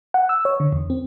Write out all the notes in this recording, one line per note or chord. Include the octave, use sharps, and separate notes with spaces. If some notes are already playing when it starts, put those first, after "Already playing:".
F#5
E6
C#5
D3
E2
C4